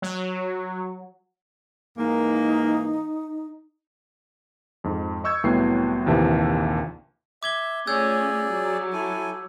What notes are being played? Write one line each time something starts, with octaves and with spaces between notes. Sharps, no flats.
F#3
G#2 E3 A#3 D#4
F2 G#2
D#5 C#6 E6 G6 G#6
C2 A2 F#3 B3 G5 C7
A#1 D#2 C3 E3 F3
E5 D6 G#6 G7
A3 C#4 F4 G#4 D5 E6 G6 G#6
F#3
E4 A4 G#5